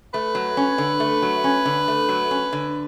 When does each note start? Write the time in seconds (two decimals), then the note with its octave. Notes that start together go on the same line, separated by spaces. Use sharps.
0.13 A3 B4
0.35 F#3
0.57 C#4
0.78 D3
1.00 A3
1.22 F#3
1.44 C#4
1.66 D3
1.88 A3
2.09 F#3
2.31 C#4
2.53 D3